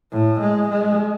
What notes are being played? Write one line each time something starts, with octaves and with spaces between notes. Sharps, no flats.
A2
G#3
G#3